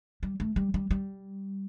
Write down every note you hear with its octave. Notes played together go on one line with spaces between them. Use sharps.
G3
A3
G3
G3
G3